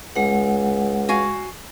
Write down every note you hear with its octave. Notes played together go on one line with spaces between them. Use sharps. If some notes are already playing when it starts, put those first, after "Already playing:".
C#2 G#3 F#5
F#4 F5 G#5